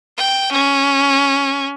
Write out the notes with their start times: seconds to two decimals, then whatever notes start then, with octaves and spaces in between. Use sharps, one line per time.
0.18 G5
0.52 C#4